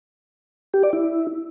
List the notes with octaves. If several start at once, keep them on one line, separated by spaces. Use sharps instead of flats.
G4
D5
E4